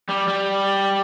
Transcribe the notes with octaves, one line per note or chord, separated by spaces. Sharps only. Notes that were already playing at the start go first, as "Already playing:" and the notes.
G3
G3